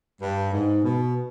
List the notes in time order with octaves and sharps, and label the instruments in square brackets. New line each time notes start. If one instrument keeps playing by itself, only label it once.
[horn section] G2
G#2
B2